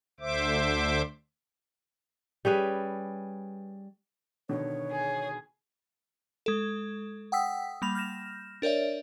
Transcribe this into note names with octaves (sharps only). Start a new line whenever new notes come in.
D2 D3 C5 E5 D6
G3 C#4 G#4 B4
B2 D3 D#3 C#5
G#4
G#3 A4
F#5 G5 D#6 E6 B6
G3 A#3 B5 F7
F6 G6 A#6 E7
D4 A#4 C#5 D5 E5